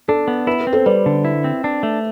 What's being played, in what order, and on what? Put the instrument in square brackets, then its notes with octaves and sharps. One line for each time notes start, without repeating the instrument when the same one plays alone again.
[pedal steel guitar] D4 [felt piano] A4
[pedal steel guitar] B3
[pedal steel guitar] E4 [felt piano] B4
[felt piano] B4
[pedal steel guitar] C4
[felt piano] A4 C5
[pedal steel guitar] G3 [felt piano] B4 D5
[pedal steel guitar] D3
E4
C4
D4
A3